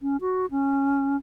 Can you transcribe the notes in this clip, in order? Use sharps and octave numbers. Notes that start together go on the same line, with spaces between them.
C#4
F#4
C#4